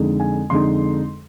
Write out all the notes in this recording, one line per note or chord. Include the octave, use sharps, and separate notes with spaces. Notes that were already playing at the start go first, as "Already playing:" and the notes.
Already playing: F2 D3 G#3 D#4
G#5
F2 D3 G#3 D#4 C6